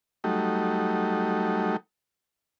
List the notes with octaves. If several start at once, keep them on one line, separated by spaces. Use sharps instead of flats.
F#3 G3 A3 D#4